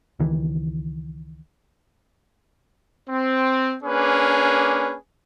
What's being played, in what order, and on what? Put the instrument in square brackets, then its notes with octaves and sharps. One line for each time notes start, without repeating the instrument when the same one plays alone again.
[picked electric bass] C#2 D#3 E3
[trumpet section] C4
A#3 C#4 D4 G#4 B4